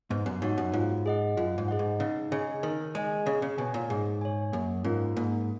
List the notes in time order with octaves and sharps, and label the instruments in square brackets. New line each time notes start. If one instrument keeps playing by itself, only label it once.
[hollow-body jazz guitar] G#2 [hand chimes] B3
[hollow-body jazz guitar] F#2
[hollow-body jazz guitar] G#2 [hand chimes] D#4 F#4 C#5 F#5
[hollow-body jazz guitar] F#2
[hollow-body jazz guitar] G#2 [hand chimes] F4
[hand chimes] G#4 D#5 F#5
[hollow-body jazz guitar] F#2 [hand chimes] F4
[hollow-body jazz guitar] G#2
[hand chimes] G#4 D#5 F#5
[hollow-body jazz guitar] G#2
[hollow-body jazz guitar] C#3 [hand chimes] D#4
[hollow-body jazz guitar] C#3 [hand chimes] G#4 D#5 G#5
[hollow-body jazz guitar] D#3 [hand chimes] D#4
[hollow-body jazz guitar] G#3 [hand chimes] G#4 D#5 G#5
[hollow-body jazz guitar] C#3 [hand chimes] G#4
[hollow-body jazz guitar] C#3
[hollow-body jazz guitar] B2 [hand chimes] C#5 G#5
[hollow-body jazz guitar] A#2
[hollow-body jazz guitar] G#2 [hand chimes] G#4
[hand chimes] C#5 G#5
[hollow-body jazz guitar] F#2 [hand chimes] A#3
[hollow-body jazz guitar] G#2 [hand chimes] C#4 F4 A#4
[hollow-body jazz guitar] G#2 [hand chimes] A#3